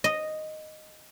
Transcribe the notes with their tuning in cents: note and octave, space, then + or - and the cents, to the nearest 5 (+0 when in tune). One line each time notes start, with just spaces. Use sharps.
D#5 -5